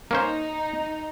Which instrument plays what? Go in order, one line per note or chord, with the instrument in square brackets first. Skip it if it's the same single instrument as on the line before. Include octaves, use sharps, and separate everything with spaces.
[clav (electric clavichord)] A#3 C#4 C5 [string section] D#4